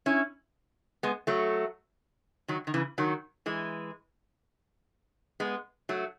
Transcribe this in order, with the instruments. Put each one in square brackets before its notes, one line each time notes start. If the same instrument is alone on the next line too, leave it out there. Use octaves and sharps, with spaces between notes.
[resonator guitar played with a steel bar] C#4 E4
G#3 B3
F#3 A3
D#3 F#3
D#3
C#3 E3
D#3 F#3
E3 G#3
G#3 B3
F#3 A3